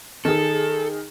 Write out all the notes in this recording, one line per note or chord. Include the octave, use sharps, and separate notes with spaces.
D#3 G#4 A4